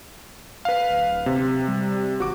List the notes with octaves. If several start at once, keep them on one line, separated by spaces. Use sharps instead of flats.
B4 F5
D1
C3
G3
G#1 F#4 D6